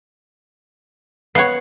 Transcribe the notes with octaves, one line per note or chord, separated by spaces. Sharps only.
B3 C#5 F#5 C7